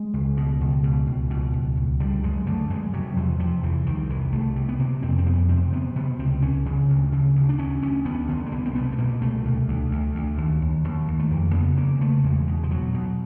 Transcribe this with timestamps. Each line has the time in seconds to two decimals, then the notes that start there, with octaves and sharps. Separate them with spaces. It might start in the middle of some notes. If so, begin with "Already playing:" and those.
Already playing: G#3
0.14 C#2
0.37 B2
0.61 C#2
0.84 B2
1.07 C#2
1.30 B2
1.53 C#2
1.77 C#2
2.00 D3 G3
2.23 F#2 G#3
2.47 D3 A3
2.70 F#2 G#3
2.93 C3 F#3
3.17 E2 F3
3.39 C3 F3
3.63 E2 E3
3.86 C2 D#3
4.09 C3 E3
4.33 C2 A3
4.56 C3
4.69 B3
4.79 C3 A#3
5.03 F2 C4
5.18 C4
5.26 F2 B3
5.49 C3 C4
5.72 C3 B3
5.96 C3 B3
6.19 C#2 C4
6.42 C#2 C#4
6.65 C#3
6.89 D2
7.12 C#3
7.35 D2
7.49 D4
7.58 D2 C#4
7.82 D2 C#4
8.05 D2 B3
8.29 D3 B3
8.46 A#3
8.52 C2 B3
8.66 C4
8.75 B2 B3
8.92 A3
8.98 B2 A#3
9.22 C2 A3
9.45 D2
9.68 D2
9.91 D2
10.15 D2
10.38 D#2
10.62 D#2
10.84 D#2
11.08 D#2
11.19 A3
11.31 F2 A#3
11.54 C#3 B3
11.77 C#3 A#3
12.01 C#3 A3
12.24 E2 G#3
12.47 B2
12.63 F3
12.71 B2 F#3
12.94 B2